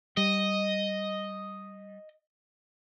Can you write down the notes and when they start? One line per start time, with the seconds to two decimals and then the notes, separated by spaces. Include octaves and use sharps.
0.17 G3 D#5